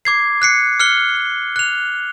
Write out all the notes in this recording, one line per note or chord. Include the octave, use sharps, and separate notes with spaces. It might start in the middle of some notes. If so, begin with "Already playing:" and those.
D6 G#6 C7
F#6 C7 C#7
F6 F#6 C#7 G7
F#6 F7